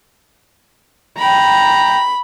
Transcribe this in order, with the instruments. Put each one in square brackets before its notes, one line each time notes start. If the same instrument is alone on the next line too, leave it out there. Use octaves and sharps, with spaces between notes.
[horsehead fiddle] G5 A#5 [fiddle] B5